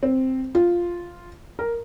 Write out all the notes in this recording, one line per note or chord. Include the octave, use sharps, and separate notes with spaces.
C4
F4
A#4